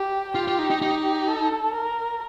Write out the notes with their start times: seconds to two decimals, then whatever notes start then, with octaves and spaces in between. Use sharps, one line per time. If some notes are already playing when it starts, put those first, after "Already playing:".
Already playing: G4
0.35 F4 G4
0.48 F4
0.59 D#4
0.70 D#4
0.82 D#4 G4
1.28 A4
1.74 A#4